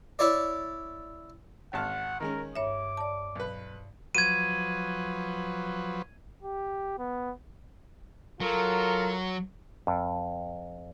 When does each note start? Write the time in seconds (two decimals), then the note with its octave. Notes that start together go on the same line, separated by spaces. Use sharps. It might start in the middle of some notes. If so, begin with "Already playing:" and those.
0.19 E4 C#5 D5
1.73 G#1 F#5 A5 F6
2.20 D#3 G#3 C#4 A#4
2.56 G2 C#5 E5 D6
2.97 D5 A5
3.35 B1 B4
4.15 F3 F#3 B4 G#6 D#7
6.42 G4
6.99 B3
8.40 F#3 F4 A4 A#4
9.87 F2